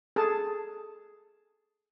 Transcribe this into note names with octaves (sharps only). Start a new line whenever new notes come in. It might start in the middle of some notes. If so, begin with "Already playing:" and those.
G#4 A4 A5